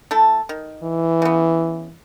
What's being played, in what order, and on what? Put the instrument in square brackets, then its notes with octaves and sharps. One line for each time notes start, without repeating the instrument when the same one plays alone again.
[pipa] A3 E4 A4
D#3
[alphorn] E3
[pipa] C#3 B3